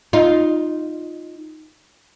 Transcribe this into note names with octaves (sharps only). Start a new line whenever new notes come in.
D#4 F4